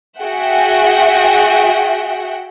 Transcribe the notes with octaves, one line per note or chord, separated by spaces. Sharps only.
F#4 G#4 E5 F#5 G5